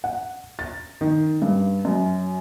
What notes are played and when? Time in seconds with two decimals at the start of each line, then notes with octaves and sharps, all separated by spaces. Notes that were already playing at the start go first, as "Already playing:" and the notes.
0.04 F#5
0.59 A6
1.01 D#3
1.42 G2
1.85 F#2